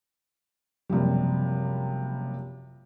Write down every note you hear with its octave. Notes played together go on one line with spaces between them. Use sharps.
F#1 C3 F3 G3